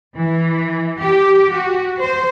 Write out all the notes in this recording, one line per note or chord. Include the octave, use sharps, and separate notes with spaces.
E3
G4
F#4
C5